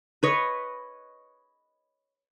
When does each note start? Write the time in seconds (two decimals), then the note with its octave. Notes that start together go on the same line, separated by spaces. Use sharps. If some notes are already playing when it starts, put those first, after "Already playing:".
0.23 B4 C#5 D#5